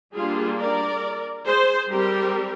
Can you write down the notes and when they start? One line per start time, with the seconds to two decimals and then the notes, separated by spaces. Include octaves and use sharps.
0.14 G3 A#3 D4 F4 G#4
0.58 A#4 D5
1.46 G#4 C5
1.90 G3 C4 G4 A#4